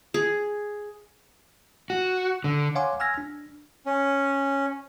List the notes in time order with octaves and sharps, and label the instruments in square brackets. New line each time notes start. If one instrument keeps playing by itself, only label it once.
[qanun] G#4
[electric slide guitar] F#4
D3
[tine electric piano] C#5 F5 F#5 G#5 C6 D6
G#5 E6 F6 G#6 A#6
D4
[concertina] C#4